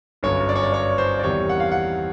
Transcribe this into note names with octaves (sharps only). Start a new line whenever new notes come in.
G1 F#2 D3 C#5
D5
C#5
D5
C#5
C5
D5
E2 C3 D#3 G3 C#5
F#5
F5
F#5